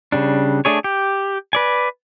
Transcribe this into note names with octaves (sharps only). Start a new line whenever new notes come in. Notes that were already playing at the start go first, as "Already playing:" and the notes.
C#3 G3 D4
A3 D4 G#4 C#5
G4
B4 D5 G#5